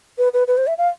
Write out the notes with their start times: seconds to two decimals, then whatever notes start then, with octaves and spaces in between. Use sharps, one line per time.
0.18 B4
0.34 B4
0.48 B4
0.58 C5
0.67 E5
0.78 F5